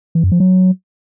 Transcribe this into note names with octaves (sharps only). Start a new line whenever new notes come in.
E3
F#2
F3
F#3